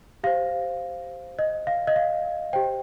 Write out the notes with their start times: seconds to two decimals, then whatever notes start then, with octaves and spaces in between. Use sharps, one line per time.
0.24 G4 C5 F5
1.39 D#5
1.67 F5
1.87 D#5
1.96 F5
2.53 G4 C5 G5